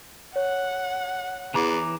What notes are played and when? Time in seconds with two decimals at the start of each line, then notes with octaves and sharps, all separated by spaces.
0.36 C#5 F#5
1.54 E2 E3 A#5 D6